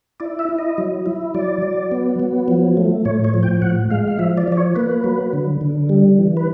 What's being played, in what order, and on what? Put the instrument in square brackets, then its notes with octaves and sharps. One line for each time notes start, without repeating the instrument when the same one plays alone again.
[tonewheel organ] E4 D5
E5
E4
D#5
F#3
E4
F#3 D5
F#3
B3
F#3
F3
A3
A2 C#5
C#5
F3
G5
A2 F#5
G#3 F5
F5
F3 E5
D5
F3 D5
C#5
A#3 B4
F#3
D3
D3
G3
E3
B4